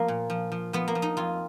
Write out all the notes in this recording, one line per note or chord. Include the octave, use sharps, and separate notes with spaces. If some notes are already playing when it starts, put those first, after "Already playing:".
Already playing: F3 A#3
A#2
F3
F3
F3 B3
A#3
F3
D#4
F2 F4